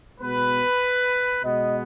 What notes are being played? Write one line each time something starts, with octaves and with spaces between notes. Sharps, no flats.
B2 G#3 B3 B4
B2 G#3 B3 D#5